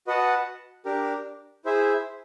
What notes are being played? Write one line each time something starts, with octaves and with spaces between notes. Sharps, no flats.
F#4 B4 D#5 F#5 A5
D4 G4 A#4
E4 G#4 C5 E5